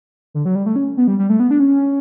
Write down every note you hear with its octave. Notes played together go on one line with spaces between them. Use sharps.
D3
F#3
G3
A3
C#4
B3
G3
G3
A3
B3
D4
C#4